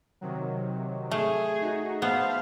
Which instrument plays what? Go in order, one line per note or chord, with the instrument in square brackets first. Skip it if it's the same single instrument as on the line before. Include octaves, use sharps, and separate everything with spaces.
[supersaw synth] C3 D#3 F#3
[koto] A3 [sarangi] G#4
[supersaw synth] D#4 F#4
[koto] B3 [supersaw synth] C5 E5 A5 [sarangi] F5